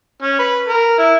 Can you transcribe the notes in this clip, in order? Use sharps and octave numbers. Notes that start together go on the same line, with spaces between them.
C#4
B4
A#4
E4